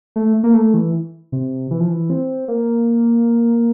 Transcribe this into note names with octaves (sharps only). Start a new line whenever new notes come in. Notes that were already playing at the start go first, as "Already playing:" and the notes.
A3
A#3
A3
E3
C3
E3
F3
E3
C4
A#3